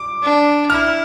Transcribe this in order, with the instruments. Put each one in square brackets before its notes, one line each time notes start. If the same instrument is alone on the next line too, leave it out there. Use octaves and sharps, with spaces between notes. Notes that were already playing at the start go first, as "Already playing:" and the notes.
Already playing: [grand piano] D6
[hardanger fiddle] D4
[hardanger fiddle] E4 [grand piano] F6